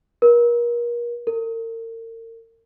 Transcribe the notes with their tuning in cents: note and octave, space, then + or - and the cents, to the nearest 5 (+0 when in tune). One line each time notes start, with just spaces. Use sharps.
A#4 +35
A#4 -40